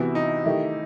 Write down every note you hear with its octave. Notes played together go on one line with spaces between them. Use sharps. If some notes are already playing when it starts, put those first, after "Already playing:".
Already playing: C3 E3 B3 E4 F#4
D#4
D#3 A3 E4 G4